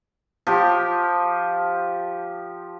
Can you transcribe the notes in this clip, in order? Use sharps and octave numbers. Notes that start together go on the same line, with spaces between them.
F3 G4 G5